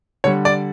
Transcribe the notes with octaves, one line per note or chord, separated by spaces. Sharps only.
D3 G3 C#5
D5